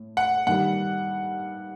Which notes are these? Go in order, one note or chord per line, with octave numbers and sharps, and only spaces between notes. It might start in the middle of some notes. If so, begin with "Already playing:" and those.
Already playing: A2
F#5
G2 D#3 G3 F#5